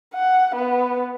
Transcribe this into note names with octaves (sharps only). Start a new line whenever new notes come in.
F#5
B3